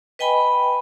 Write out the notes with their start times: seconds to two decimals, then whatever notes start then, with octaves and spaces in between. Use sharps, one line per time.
0.19 B4 D#5 G5 G#5 B5